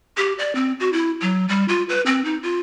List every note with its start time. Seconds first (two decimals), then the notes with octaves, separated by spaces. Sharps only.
0.17 G4
0.39 D5
0.55 C4
0.80 F#4
0.93 E4
1.22 F#3
1.49 G3
1.68 F4
1.89 B4
2.06 C4
2.25 D#4
2.43 F4